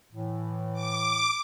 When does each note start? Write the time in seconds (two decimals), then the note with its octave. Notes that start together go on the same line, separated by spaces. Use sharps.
0.13 A2 E3
0.73 D6